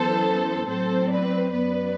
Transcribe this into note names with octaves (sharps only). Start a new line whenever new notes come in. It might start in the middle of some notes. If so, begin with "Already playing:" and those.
Already playing: F#2 E3 B3 A4 C5
A2 F#3 C4 A4 C5
B4 D5
F#2 F#3 B3 B4 D5